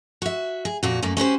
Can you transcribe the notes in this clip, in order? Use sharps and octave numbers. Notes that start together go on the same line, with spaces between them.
F#4 E5
G#4
F2 A#2 F#4
F#2 A3 A#3
C#4 F#4 G4 C5